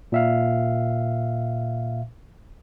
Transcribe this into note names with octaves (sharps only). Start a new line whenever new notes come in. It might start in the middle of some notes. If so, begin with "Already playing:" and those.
A#2 E5 F5